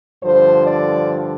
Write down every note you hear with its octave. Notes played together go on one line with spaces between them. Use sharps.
G2 D3 F3 C5
D5